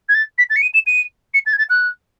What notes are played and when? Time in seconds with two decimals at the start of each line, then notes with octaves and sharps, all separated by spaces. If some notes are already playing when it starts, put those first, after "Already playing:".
0.09 G#6
0.14 A6
0.38 B6
0.50 A6
0.56 C#7
0.62 D#7
0.74 E7
0.86 D#7
1.34 C#7
1.46 A6
1.53 G#6
1.58 A6
1.69 F#6